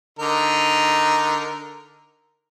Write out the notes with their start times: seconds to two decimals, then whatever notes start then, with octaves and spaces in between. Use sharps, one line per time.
0.19 D3 D#4 A#4